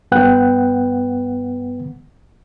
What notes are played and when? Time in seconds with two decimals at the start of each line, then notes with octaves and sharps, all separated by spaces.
0.12 G2 B3 B4 F#5 G5 F#6